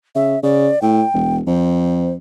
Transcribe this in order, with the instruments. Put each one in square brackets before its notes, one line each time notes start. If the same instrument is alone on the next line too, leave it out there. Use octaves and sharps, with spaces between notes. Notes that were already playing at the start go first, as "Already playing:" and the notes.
[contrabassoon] C#3 [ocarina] E5
[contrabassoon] C#3 [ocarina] D5
[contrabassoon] A2 [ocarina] G5
[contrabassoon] E1
[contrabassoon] F2 [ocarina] C5